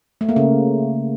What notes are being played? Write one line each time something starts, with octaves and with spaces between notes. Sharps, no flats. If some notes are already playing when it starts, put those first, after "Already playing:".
A3
A#3
C#3